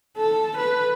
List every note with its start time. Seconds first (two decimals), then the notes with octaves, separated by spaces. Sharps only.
0.18 A4
0.58 B4